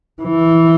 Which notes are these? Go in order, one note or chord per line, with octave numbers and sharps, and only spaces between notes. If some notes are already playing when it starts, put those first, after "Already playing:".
E3